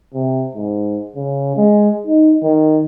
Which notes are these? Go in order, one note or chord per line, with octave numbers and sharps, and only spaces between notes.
C3
G#2
C#3
G#3
D#4
D#3